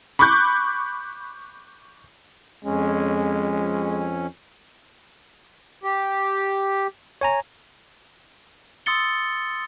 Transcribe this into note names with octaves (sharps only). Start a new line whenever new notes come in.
B5 C#6 D6 F#6 G6
F2 G#3 C#4
G4
C#5 G#5 A#5
C6 D#6 E6 A6 C#7 G7